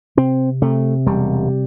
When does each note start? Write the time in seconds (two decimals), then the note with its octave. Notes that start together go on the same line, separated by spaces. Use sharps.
0.17 C3 C4
0.62 C3 A3
1.06 E1 G3